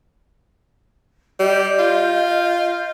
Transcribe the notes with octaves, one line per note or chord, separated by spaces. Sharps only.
G3 D#5 G6
F4